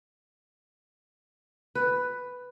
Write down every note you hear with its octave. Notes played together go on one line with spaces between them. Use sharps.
B4